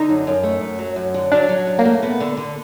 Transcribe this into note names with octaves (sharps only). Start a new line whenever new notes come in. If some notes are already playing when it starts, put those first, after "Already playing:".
Already playing: D3 D#4
F#2
F#2
A3
F#2
F#3
F#2
D3
F#3 D4
F#3
F#2
A#3
A3
B3
D3
D3